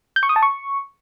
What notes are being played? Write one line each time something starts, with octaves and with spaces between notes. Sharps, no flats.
G6
C#6
D#6
A5
C#6